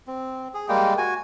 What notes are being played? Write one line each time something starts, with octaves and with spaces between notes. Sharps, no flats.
C4
G#4
G3 G#3 A#3 G5
F#4 G#5